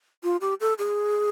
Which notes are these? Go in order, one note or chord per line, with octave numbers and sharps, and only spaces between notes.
F4
G4
A4
G#4